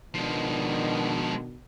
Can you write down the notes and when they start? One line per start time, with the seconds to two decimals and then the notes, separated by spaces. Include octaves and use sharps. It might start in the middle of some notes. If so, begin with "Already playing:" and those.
0.14 B2 D#3 F3 G#3 D4